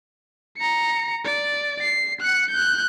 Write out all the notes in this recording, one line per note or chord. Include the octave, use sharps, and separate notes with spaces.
A#5 C#7
D5
C7
F#6 C#7
F#6 G6